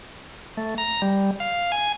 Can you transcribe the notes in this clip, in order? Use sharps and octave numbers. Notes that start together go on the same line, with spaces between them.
A3
A#5
G3
F5
G#5